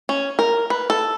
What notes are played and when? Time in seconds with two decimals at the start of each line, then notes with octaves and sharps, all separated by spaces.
0.09 C#4
0.39 A#4
0.70 B4
0.90 A4